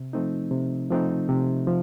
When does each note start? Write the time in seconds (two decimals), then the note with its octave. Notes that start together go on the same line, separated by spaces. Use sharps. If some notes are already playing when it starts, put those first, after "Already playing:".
Already playing: C3
0.13 F3 A3 C4 D#4
0.51 C3
0.90 F3 A3 C4 D#4
1.29 C3
1.67 F3